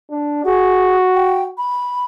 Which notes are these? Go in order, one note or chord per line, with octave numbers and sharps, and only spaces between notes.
D4
F#4 G#4
G5
B5